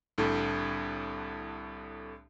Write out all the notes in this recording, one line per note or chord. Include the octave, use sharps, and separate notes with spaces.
C2 A2 D3